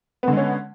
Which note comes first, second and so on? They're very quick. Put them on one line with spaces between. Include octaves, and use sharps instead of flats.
B3 D3 G#3 C#4